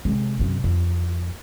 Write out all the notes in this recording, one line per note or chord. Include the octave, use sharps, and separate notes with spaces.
C3 G#3
F#2 C3
F2